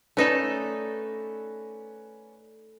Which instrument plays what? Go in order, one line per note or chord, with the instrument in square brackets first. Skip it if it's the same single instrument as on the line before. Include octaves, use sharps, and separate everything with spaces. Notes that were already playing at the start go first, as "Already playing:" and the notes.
[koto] A3 D#4 A4 [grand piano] C#4 B4 D5